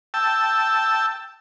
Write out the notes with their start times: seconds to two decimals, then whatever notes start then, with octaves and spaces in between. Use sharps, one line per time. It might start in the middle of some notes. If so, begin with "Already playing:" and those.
0.14 G5 A5 E6